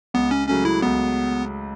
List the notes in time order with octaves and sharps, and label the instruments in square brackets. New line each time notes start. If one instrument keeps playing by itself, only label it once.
[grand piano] C#2 [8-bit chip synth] B3
[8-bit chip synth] C#4
[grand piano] C#3 F#3 A3 [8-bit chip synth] C#4
[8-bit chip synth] E4
[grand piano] C#2 [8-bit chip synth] B3